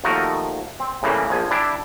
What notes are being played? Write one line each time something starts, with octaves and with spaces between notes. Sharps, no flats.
D#2 F3 A3 F#4 A#4 D#5
C4
A2 C#3 E3 G3 A#3
A#1 F3 G#5
D4 E4 G4